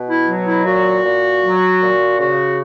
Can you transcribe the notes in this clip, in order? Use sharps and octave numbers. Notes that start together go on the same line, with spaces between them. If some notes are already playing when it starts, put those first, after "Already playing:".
Already playing: B2
E4
F#3
E4
A#2 F#4
A#2
F#3
A#2
C#3 F#4